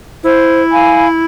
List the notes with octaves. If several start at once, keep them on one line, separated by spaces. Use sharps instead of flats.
E4 C5
F5 G#5 B5